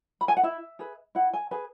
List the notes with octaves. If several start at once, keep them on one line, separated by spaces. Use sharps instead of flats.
B5
G#5
F#5
E4 E5
G#4 B4
E4 F#5
G#5
G#4 B4 G#5